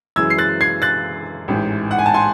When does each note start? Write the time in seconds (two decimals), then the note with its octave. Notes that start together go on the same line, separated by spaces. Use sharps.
0.16 F#2 E3 G#3 E6 G#6
0.30 C7
0.38 F#6 A6
0.61 G#6 C7
0.82 F#6 A6
1.48 A1 G#2 E3
1.91 F#5
1.99 G#5
2.06 A5
2.14 G#5 C6